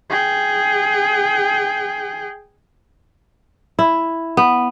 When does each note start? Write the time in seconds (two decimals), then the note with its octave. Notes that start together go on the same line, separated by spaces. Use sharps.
0.10 G#4 G5
3.79 E4
4.37 B3